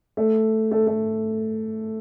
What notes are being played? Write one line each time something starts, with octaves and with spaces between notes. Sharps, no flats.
A3
A3
A3